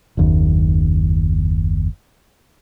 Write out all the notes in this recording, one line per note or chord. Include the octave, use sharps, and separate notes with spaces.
F#1 D#2